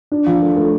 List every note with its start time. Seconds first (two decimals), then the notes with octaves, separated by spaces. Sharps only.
0.12 D4
0.26 F3
0.42 A3
0.56 A3